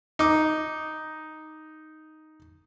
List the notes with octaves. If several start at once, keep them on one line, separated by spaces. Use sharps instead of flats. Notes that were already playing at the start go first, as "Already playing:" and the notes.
D#4 D6